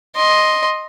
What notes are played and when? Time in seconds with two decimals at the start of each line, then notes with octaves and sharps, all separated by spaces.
0.16 D#5 C6